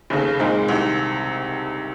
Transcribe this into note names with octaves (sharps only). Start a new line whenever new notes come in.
F1 D#2 C#3
A#2 G#3 C4 D#4
C2 C3 D#3